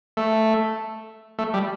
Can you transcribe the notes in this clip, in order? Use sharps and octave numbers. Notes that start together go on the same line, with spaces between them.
A3
A3
G3